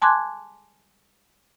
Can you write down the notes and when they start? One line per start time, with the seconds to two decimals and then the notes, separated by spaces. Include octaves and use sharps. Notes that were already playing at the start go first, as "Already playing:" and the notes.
0.02 G#5 A5 C6 D6 F#6 G#6